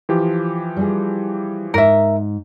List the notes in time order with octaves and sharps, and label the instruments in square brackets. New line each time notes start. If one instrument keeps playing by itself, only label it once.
[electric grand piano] E3 F3 G4
[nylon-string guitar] G3 F4 G#4
[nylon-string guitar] G#2 [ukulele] A#4 E5